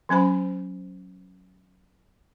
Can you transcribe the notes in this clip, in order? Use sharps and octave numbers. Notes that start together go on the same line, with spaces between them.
F#3 C#4 C5 B5